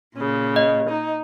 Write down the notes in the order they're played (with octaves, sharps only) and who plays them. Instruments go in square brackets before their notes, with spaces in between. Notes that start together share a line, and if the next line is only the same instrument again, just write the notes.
[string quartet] A#2 C#3
[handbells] D#5
[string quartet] D#4